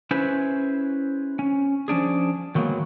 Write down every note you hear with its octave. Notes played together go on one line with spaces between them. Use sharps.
C#4 E4 G#4 B4 C5
C#4
F3 C#4 D4 G#4
D#3 F#3 G#3 A#3 B3